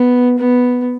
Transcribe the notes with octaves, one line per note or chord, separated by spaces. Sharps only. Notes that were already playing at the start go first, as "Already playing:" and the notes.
Already playing: B3
B3